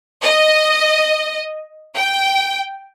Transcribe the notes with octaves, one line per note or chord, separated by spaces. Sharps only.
D#5
G5